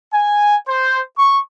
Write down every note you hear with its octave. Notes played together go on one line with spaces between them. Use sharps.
G#5
C5
C#6